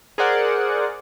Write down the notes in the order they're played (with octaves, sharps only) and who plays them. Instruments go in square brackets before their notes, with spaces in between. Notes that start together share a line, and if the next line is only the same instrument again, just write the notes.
[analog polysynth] G#4 A#4 C5 D5 F#5